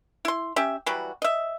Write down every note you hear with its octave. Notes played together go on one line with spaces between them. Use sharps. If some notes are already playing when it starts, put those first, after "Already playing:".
E4 C6
C#4 G4 E5
E3 F#3 G3 F#4
D#5 E5